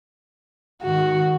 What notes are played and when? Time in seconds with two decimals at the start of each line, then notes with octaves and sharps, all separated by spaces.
0.82 G#2 D#3 F#4